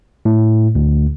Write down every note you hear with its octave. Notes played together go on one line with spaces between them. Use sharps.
A2
D2